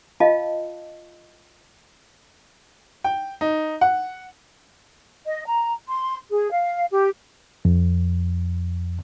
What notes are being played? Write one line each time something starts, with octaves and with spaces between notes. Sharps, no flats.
F4 D#5 F5 A5
G5
D#4
F#5
D#5
A#5
C6
G#4
F5
G4
F2